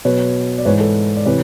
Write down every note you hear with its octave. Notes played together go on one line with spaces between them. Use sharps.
B2 F#3 B4 C#5
D5
G#2 E3 G#3 B4 C#5
A4 B4
D5
C3 E3 B4 C#5